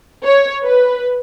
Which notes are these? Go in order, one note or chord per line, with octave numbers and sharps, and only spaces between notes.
C#5
B4